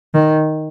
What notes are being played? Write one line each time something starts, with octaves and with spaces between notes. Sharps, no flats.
D#3